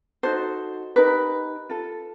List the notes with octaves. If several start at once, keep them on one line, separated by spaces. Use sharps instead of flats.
D#4 F#4 A4 C5
D#4 G4 A#4 B4
F4 A4